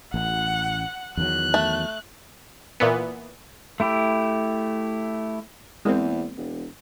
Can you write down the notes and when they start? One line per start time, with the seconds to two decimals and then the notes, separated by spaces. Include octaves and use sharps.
0.14 A1 F#5
1.17 E2 D#3 F#3 F#6
1.54 A3
2.80 A#2 E3 B3
3.80 A3 E4 G4
5.85 E2 G#3 A#3 C4
6.37 E1